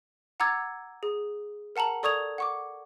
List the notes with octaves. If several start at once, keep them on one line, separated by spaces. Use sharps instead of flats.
F#5 A#5 D6 E6 G#6 A6
G#4
A#4 F#5 A5 A#5 F#7
A4 D5 C#6 D#6 G#6 F7
F#5 C#6 D6